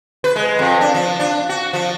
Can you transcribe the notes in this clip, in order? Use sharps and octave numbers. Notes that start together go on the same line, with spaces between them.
B4
G#3
F2
D4
F3
D4
F#4
F3